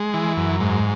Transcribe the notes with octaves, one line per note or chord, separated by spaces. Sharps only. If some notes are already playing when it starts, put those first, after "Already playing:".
Already playing: G#3
E3
F#2
G#2